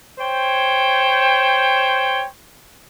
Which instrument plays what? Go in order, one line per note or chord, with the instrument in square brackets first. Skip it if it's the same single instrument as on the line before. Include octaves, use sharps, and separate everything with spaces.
[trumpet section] C5 C#5 G5